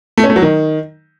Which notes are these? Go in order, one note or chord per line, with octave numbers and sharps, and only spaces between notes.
A3
C#4
A3
F#3
D#3